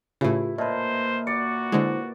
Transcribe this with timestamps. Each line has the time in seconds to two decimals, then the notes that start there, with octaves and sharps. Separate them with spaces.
0.21 A2 C#3 E4 F4 G4 B4
0.58 A#2 B4 C5 D#5 E5 A5
1.27 F#4 D5 C#7
1.72 D3 G#3 E4 C5